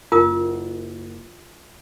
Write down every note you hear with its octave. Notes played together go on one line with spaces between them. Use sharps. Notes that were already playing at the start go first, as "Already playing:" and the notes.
F#1 F4 A#4 D#6